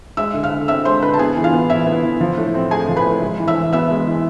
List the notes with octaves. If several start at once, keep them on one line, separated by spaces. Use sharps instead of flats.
G#3 E5 E6
D3
F5 F6
D3
C4 E5 E6
G#3 C5 C6
D3 B4 B5
A5
B3 G#4 G#5
E3
F4 F5
B3
E3 E4 E5
B3
E3
F3
A2
C4
A3 G#4 G#5
F3
B4 B5
A2
G#3
E3
E5 E6
E3
B3 E5 E6
G#3
E3